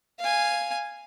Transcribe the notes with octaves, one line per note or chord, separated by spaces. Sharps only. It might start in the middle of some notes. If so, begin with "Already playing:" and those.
F5 G#5